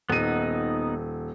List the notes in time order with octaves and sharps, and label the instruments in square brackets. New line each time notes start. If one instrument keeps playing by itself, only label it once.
[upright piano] D#1 D#7 [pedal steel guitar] B3 D#4